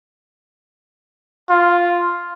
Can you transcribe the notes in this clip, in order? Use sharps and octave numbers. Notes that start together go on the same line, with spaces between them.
F4